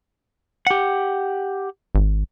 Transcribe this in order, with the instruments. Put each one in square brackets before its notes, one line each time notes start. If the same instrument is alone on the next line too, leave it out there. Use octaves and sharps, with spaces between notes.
[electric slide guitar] G4 F#5
[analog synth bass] G#1